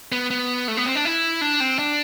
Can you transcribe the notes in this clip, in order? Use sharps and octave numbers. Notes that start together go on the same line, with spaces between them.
B3
B3
A3
B3
C4
D4
E4
D4
C4
D4